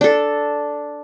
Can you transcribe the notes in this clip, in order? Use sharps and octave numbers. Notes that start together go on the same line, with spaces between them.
D4 A4